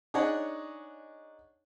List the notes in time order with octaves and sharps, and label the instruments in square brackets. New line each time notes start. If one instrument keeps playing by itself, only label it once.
[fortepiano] D4 D#4 G#4 C#5 D#5 F#5